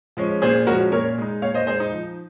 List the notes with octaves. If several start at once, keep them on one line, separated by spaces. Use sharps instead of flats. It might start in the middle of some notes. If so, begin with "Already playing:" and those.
F3 G#3 C#4
A#2 G#4 C5
F3 G#3 C#4 F#4 A#4
A#2 A#4 C#5
G#3 D#4
A#2 C#5 F5
C5 D#5
G#3 D#4 G#4 C5
D#4
F3